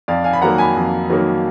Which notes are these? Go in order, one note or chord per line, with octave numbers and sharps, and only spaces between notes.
F2 D5 F5
F5 G#5
B5
D#3 F#3 A#3 F#5 A#5
G#5 B5
F2
D#3 F#3 A#3